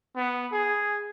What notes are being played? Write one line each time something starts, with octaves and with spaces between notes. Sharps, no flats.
B3
G#4